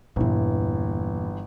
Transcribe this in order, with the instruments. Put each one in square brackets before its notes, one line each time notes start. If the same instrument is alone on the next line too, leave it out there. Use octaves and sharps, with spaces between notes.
[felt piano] G1 E3 [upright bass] E2 A#2